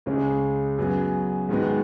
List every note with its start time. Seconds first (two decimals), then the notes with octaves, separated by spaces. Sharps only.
0.06 C#2 C#3 G#3 C#4
0.78 F#2 F#3 B3 G#4
1.49 G#2 D#3 G#3 B3 F#4